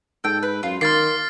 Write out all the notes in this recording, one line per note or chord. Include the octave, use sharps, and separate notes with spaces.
G#2 A4 G5
B4
F#2 F4
D#3 A#3 C6 F6 A6 C7